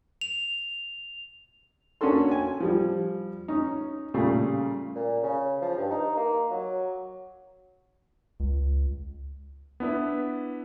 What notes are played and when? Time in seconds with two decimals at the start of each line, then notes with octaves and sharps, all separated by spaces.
0.21 F7
2.01 A#3 C#4 D4 F#4 A4 C6
2.31 G#5
2.60 F3 G3
3.48 C#4 D#4
4.14 A#2 C#3 G3 A3
4.95 A#2
5.23 C#3
5.62 F3
5.77 G2
5.91 D#4
6.17 A#3
6.51 F#3
8.40 C#2
9.80 B3 D4 E4 B4